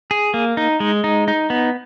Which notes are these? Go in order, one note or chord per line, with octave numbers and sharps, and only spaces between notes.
G#4
A#3
D#4
G#3
D#4
D#4
B3